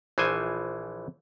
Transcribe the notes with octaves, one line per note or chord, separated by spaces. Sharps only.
A#1 E3 F3 C5 G#5